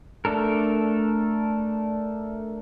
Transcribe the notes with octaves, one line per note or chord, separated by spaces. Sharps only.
A3 D4 A4 A#4